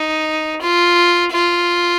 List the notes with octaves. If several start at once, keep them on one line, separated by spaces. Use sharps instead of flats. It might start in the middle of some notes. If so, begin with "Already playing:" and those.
Already playing: D#4
F4
F4